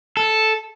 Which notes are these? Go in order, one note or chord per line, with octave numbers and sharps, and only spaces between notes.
A4